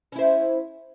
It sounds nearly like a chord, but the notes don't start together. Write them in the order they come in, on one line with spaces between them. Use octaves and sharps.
C#4 E4 C5